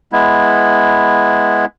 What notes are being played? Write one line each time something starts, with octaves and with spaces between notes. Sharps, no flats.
G#3 B3 E4